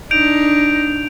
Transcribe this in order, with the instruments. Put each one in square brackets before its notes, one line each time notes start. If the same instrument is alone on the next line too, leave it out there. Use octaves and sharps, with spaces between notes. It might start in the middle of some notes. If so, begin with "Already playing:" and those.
[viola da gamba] D4 D#4 [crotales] G6 D7 F7